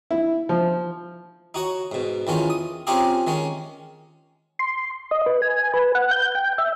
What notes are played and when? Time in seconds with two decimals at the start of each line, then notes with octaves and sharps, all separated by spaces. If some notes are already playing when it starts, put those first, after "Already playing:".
0.11 E4
0.49 F3
1.54 D#4 F#4 C#5
1.92 G#2 B2
2.27 E2 D#3 C#4 F4
2.50 D#6
2.87 C4 C#4 D#4 F4 G4 G#4
3.27 D#3 G#3 C#4
4.59 C6
5.11 D#5
5.26 B4
5.42 G#5
5.74 B4
5.95 F#5
6.11 G6
6.35 G5
6.58 E5